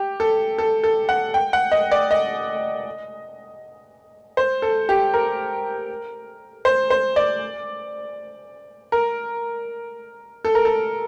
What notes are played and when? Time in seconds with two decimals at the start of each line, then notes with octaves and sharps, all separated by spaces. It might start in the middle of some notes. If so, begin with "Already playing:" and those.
Already playing: G4
0.20 A4
0.58 A4
0.84 A4
1.09 F#5
1.34 G5
1.53 F#5
1.72 D#5
1.92 D5
2.11 D#5
4.37 C5
4.62 A4
4.89 G4
5.14 A#4
6.65 C5
6.90 C5
7.16 D5
8.92 A#4
10.45 A4
10.55 A#4
10.65 A4